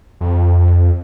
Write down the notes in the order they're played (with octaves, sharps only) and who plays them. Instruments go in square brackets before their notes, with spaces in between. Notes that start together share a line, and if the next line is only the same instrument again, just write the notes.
[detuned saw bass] F2